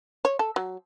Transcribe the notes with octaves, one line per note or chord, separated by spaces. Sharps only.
C#5
A4
F#3